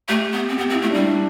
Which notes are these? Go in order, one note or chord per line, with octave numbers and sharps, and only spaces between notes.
A3 G4
B3
C4
B3 G4
C4
E4
A3
G3 D4